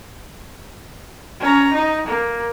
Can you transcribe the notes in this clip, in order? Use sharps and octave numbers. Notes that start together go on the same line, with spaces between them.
C#4 A#5
D#4
A#3